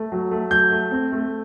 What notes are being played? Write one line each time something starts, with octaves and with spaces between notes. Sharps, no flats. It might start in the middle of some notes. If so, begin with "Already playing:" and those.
Already playing: A3
F#3
A3
F#3 G6
A3
C4
A3